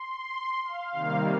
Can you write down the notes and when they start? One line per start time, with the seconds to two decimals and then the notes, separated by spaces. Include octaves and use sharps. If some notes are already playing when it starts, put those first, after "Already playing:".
Already playing: C6
0.63 F5
0.92 C3 D#3 G3 A#3